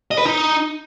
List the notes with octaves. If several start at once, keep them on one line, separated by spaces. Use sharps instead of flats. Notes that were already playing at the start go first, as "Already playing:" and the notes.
D#5
B4
D#4